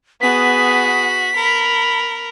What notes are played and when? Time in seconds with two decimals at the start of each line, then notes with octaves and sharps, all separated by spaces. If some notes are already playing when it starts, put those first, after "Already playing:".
0.21 B3 F#4 G#4 B6
1.35 A#4 B5